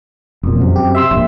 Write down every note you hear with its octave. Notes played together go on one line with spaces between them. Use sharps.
E1 F2 A#2
F#2 C3
G4
E5 C6 E6
D#1 A#1